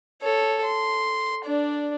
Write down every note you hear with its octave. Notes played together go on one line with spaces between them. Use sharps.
A4 C#5
C6
D4 D5